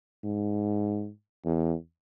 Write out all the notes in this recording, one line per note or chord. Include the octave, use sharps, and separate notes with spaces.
G#2
E2